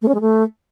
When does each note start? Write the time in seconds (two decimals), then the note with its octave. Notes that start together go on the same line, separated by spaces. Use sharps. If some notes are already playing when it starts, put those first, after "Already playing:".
0.02 A3
0.08 C#4
0.14 G#3
0.20 A3